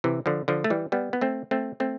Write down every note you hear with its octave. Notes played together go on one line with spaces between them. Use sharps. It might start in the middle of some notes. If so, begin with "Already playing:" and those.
C3 E3
D3 F3
D3 F3
A3
E3 G3
G3 B3
B3
A3 C4
A3 C4
A3 C4